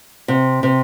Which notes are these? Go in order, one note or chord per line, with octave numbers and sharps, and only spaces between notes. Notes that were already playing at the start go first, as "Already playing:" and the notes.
C3
C3